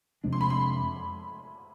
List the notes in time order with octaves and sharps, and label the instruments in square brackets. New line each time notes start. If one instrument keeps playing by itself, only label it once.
[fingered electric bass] F2 C3 G#3 D4
[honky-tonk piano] C6
B5
C6